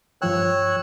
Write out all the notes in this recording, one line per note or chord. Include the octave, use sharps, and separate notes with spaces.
G2 F3 C#5 G5 E6 F#6